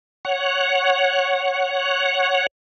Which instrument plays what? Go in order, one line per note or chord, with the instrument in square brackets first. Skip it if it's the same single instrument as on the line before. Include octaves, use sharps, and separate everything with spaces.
[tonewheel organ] C#5 F#5